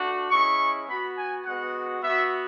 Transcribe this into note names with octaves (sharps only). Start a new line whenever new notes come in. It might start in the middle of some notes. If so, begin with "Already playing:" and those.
Already playing: A3 D4 F#4
G#3 C#4 E4 C#6
B3 F#4 B5
G#5
G#3 B3 F#4 F#5
B3 F#4 E5